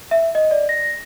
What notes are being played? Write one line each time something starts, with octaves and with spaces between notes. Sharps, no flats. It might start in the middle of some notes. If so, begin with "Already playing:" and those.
E5
D#5
D5
A#6